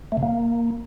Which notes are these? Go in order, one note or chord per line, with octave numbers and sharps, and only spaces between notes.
A3
C3
A#3